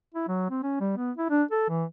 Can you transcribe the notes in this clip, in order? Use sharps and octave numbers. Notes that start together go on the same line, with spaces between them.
E4
F#3
C4
C#4
G3
B3
E4
D4
A4
E3